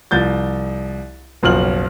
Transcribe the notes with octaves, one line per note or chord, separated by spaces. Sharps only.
C2 F3 G6 A6
F#1 B1 F3 F6 F#7